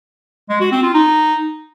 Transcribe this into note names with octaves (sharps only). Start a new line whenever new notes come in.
G#3
F#4
C4
F4
D#4